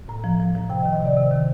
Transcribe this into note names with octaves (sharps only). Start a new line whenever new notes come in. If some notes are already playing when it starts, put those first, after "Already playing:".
A2 A#5
F3
F3
F3
C3 G5
D#5
D#3
D#5
C3 D5
C3
D#3